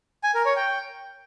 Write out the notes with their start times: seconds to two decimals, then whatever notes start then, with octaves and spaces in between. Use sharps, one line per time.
0.24 G#5
0.34 A#4
0.45 C#5
0.56 G5